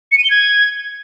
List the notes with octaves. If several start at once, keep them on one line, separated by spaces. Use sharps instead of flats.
C#7
D#7
G7
G#6